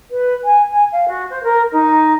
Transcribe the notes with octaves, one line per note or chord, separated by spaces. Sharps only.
B4
G#5
G#5
F5
F#4
C5
A#4
D#4